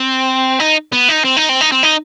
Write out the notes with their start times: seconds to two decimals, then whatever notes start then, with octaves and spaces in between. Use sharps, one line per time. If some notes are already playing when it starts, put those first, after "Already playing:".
Already playing: C4
0.60 D#4
0.92 B3
1.09 D#4
1.24 C4
1.37 D#4
1.49 C4
1.61 D#4
1.72 C4
1.83 D#4